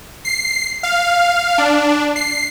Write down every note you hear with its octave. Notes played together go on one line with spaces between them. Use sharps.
C7
F5
D4
C7